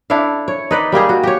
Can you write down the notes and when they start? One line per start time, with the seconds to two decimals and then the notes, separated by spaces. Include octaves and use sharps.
0.10 D4 E4 A4 F5
0.48 C#5
0.71 D#4 B4 D5
0.92 G3 A#3 G4 G#4
1.09 F#4
1.23 G4 C#5